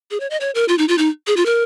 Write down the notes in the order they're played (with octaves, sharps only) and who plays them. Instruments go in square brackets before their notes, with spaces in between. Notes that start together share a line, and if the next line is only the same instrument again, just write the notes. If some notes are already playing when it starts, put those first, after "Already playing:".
[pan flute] G#4
C#5
D#5
C#5
A#4
F4
D#4
F4
D#4
G#4
F4
A#4